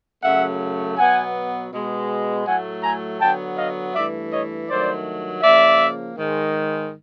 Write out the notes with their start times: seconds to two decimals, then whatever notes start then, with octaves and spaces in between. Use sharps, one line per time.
0.23 F#2 C#3 F#3 A3 E5 F#5
0.97 B2 F#3 B3 F#5 G#5
1.72 B2 G#3 B3
2.46 A2 F#3 A3 F#5 G#5
2.83 G#5 A#5
3.20 D3 F#3 B3 G5 A5
3.58 D#5 F5
3.94 G2 E3 A3 D5 E5
4.32 C#5 D#5
4.69 G2 D#3 F#3 A3 C5 D5
5.43 C#3 F3 A#3 D5 E5
6.18 G#2 D#3 G#3